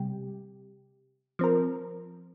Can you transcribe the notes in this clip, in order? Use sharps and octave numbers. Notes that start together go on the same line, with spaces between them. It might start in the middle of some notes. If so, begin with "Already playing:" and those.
Already playing: C3 G3 G4
F3 C4 A#4